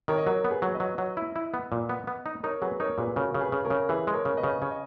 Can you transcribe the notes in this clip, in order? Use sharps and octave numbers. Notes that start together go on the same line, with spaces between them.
D#3 A#4 C#5
D#5
F#3 A#4 C#5
B3
G#4 B4
F#3
B4 D#5
F#3
F#3
E4
E4
B3
A#2
B3
B3
D#4
D#4 A#4 C#5
F#3 G#4 B4
D#4 A#4 C#5
A#2 G#4 B4
C#3 F#4 A#4
C#3
G#4 B4
C#3
A#4 C#5
C#3
E3 G#4 B4
G#3
A#4 C#5
C#3
B4 D#5
C#3
C#3 C#5
D#5